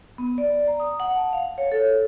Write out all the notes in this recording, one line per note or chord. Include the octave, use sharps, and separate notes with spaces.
B3
D5
A#5
D#6
F#5
A5
F5
C#5
A4